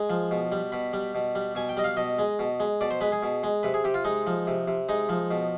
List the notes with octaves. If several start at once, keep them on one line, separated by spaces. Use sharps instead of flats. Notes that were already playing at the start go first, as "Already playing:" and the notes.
Already playing: G#3 G#5
F3
B2
G3
B2 B5
G3
B2
G3
B2 G#5
G5
G3 D#5
F5
B2 D#5
G#3
B2
G#3
B2 D5
C5
G#3 B4
G#4
B2
G#3
C3 B4
G#4
C3 G4
F4
G#3 D#4
F3
C3
C3
G#3 D#4
F3
B2